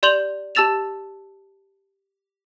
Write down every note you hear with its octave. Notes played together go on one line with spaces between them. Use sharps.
G4 D5 C6 G6 F7 F#7
G4 A5 E6 A6 E7 F7